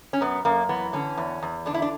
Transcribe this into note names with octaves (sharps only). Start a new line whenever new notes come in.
C#4
F#2 B3
F#2 A#3
E3 B3
D3 C#4
E2
E2
D3 D4
E4
D4